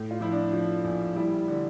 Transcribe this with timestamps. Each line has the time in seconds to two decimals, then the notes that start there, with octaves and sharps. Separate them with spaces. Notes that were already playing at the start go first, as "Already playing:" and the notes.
Already playing: A2
0.11 F4
0.20 F3 E4
0.32 D4
0.53 F3
0.84 A#1
1.16 G3 E4
1.48 D3